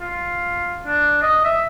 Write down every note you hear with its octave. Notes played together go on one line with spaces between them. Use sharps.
F4
D4
D#5
E5